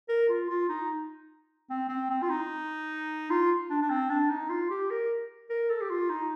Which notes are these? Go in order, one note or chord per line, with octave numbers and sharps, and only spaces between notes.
A#4
F4
F4
D#4
C4
C4
C4
F4
D#4
F4
D4
D4
C4
D4
D#4
F4
G4
A#4
A#4
A4
G4
F4
D#4